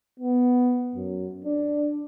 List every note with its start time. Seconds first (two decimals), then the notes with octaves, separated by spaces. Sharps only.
0.20 B3
0.96 F#2
1.45 D4